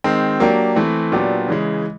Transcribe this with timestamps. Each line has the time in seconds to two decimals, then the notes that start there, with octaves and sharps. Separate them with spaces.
0.04 D#3 G#3 C4
0.40 F#3 A#3 D4 G4
0.76 E3 A3 C4
1.12 A#2 F#3 B3 D4 G4
1.48 C#3 E3 G#3